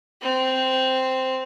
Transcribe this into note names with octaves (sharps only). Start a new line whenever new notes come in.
C4